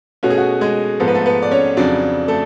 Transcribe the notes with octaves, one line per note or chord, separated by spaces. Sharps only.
B2 A3 C#4 F#4
G#4
F#4
G#3 G#4
G#2 F3 B3 A4
B4
A3 A4
B3 B4
D5
C#4 C#5
F2 C#3 F#3 D4 D5
A3 A4